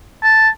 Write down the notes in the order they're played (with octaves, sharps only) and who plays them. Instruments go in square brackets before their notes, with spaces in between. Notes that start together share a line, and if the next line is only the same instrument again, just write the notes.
[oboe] A5